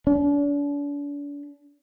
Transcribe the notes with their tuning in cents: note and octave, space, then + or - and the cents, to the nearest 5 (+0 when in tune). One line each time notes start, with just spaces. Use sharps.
D4 -40